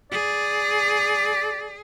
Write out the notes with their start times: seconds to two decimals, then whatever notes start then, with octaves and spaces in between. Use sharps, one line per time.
0.12 G#4 D5